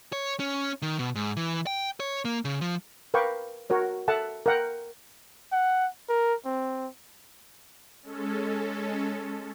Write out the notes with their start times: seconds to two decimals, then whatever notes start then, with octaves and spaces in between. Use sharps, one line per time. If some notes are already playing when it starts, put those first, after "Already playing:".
0.13 C#5
0.40 C#4
0.82 D#3
0.99 B2
1.15 G#2
1.37 E3
1.67 G5
2.00 C#5
2.25 A#3
2.45 C#3
2.61 F3
3.14 A#4 B4 F5 G5 C#6 D6
3.70 F#4 A#4 C#5
4.08 A4 E5 F#5 A5
4.46 A#4 F#5 G5
5.52 F#5
6.09 A#4
6.45 C4
8.02 G#3 C#4 A4